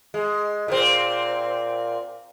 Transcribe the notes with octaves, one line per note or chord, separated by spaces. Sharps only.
G#3
A#2 C4